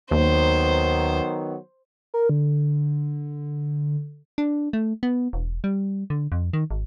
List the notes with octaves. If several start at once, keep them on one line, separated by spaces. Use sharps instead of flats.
D#2 D#3 F#3 B3 C5
A#4
D3
D4
A3
B3
E1
G3
D3
F2
D#3
G#1